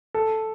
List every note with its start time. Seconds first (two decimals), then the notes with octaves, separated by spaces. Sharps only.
0.14 A4